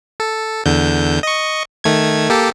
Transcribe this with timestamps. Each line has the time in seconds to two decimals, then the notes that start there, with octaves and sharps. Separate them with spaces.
0.20 A4
0.66 E2 D3 G6
1.23 D#5 C#6
1.84 D#3 A3 G#6
2.30 A#3 G4 A4